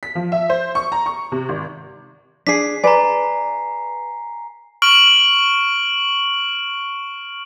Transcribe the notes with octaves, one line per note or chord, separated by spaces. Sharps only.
B6
F3
E5
C5
C#6
A#5
C#6
C3
G#1
D4 G#4 B6 C7
G#4 B4 D5 G#5 A#5
C#6 F6 D7 F#7